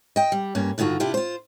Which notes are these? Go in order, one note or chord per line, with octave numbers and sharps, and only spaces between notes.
D#5 G5
G3
G2 A#3 C#4
G2 D3 D#3 F4 F#4
C3 D4 E4 F4 G4
F4 C5